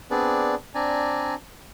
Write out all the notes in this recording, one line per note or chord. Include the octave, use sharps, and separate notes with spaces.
B3 C4 D4 G#4 B4 D5
C4 D4 D5 G#5 A#5